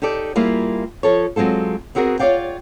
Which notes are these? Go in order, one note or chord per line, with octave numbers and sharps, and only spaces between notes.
D#4 G4 A4 D5
G3 A#3 E4 F4 G#4
F3 A4 C#5
F#3 G#3 C4 F4 A4
B3 C4 F#4 G#4 A#4
F4 G#4 C#5 D5 F5 G5